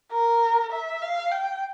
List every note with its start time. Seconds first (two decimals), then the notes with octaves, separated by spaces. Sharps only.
0.12 A#4
0.72 E5
1.01 F5
1.31 G5